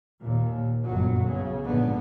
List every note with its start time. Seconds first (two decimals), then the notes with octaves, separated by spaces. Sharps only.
0.20 D#2 A#2
0.84 G1 F#2 A#2 F#3
1.22 B1 C#3
1.64 A#1 G#2 D3 B3